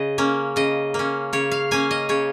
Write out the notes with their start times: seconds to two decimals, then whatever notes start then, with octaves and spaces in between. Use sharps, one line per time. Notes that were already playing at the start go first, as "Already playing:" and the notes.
Already playing: C#3 D#5
0.18 A#3 C#4
0.56 C#3 D#5
0.94 A#3 C#4
1.33 C#3 C#5
1.52 F5
1.71 A#3 C#4 G#5
1.91 D#5
2.09 C#3 C#5